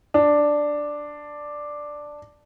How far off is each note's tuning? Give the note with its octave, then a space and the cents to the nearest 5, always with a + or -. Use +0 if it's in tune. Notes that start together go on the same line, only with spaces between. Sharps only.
D4 +0